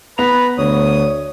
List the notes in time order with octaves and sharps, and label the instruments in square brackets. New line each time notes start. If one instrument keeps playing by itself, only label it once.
[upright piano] B3 F7 [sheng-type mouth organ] B4 A#5 B5
[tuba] D2 [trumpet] C#5 [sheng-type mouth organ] D#6